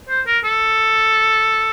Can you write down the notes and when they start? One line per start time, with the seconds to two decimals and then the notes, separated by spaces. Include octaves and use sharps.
0.09 C5
0.27 A#4
0.44 A4